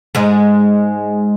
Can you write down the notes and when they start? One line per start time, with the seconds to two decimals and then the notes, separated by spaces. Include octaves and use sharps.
0.15 G#2 G#3